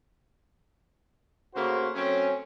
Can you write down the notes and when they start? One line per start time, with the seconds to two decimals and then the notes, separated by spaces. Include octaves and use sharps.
1.55 C#3 A3 A#3 F#4 C5
1.95 F#3 A3 C4 C#4